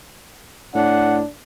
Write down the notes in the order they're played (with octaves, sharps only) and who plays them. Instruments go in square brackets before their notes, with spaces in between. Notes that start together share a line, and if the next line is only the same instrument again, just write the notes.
[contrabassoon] A2 [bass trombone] D4 [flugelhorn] F#5